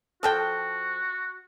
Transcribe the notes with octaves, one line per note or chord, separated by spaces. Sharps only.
F3 F#4 A4 G5